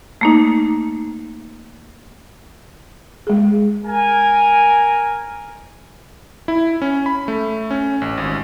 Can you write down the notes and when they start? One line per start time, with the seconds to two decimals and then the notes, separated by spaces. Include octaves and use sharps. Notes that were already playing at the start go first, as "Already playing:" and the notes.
0.21 A3 A#3 D#4
3.27 G#3 G#4
3.85 A#4 G#5
6.48 E4
6.82 C#4
7.06 B5
7.28 A3
7.71 C#4
8.02 A1
8.18 G#1